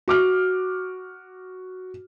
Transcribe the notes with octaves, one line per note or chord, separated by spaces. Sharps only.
F#4 D6 F6